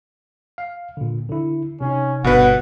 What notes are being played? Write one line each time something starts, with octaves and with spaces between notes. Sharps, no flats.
F5
A#2 D3
D3 E4
C3 C#4 D#4
G1 B2 B4 F#5